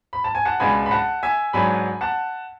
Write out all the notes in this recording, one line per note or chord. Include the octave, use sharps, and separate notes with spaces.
B5
A5
G#5
F#5 A5
C#2 B2 G#3 D4 G#5 B5
B5
F#5 A5
E5 G#5
G#2 F#3 B3 D4 G#5 B5
F#5 A5